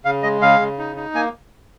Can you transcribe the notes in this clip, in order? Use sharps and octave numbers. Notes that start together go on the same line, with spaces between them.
C#3 F5
G#3 D#5
C#3 F5
C#3
D#4
D#4
A#3 G#5